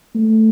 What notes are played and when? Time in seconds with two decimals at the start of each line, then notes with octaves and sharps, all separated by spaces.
0.15 A3